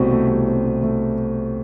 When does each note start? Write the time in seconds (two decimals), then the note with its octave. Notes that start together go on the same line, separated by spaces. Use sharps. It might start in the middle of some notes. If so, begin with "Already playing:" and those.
Already playing: C2 B2 A3 C4
0.11 A3
0.28 C2
0.47 C4
0.65 B2
0.83 A3